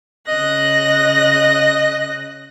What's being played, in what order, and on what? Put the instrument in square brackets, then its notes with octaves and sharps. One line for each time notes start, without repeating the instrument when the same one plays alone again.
[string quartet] C#3 F#6 A#6 [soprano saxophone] D#5